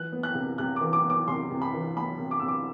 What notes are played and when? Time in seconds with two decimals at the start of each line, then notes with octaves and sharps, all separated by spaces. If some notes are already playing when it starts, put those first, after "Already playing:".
Already playing: E3 F#6
0.12 B3
0.23 F#6
0.35 C3
0.58 C3 F#6
0.76 E3 D6
0.93 D6
1.04 B3
1.10 D6
1.28 C3 C6
1.51 C3
1.62 B5
1.74 E3
1.96 B3 B5
2.19 C3
2.31 D6
2.40 C3 E6
2.48 D6